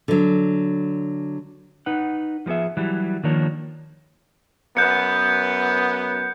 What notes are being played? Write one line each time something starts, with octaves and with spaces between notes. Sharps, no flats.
D3 F#3
D#4 B4 F#5
F3 G#3 B3 G#4 E5
E3 F#3 G3
D#3 F3 A#3 D4 C#5
F#2 B3 F#6 G6 C#7